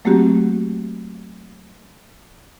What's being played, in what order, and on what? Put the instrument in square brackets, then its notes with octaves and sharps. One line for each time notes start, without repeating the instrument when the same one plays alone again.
[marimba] F#3 A3 A#3 C4 F#4 G4